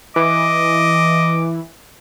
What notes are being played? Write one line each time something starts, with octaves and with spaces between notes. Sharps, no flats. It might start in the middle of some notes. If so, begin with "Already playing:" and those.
E3 D#5 D6